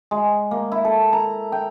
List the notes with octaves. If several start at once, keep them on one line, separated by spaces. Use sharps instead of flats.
G#3
A#3
E4
A4
A#5
G5